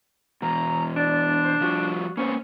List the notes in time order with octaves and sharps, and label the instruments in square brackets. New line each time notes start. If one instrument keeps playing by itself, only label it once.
[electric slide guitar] E2 B2 [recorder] A#5
[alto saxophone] D4 [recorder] D5
[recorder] C5
[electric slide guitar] F3 G3 F4 [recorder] F#4
[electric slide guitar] A#3 B3 C5 [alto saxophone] C#4